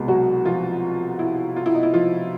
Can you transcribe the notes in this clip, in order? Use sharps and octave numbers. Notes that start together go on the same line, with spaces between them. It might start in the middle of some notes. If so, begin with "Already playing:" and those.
Already playing: C2 B2 G#3
F#3 F#4
F3 F4
E4
F4
E4
D#4
E4
F3 F4